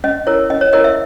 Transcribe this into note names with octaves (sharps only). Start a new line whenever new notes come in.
C#4 D#5
E4 A#4 C#5
C#4 D#5
C#5
E4 A#4 C#5 D#5
E5